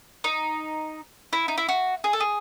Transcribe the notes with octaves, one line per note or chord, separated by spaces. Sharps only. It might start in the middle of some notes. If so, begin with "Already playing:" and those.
D#4
E4
D#4
E4
F#4
G#4
A4
G#4